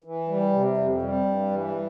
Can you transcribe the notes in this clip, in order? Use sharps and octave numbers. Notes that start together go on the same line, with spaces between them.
E3
G3
C3
F2
G3
G2
E3